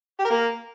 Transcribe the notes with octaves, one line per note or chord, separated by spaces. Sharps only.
G4
A#4
A#3